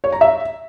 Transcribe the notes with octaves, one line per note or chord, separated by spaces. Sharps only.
C#5
A#5
E5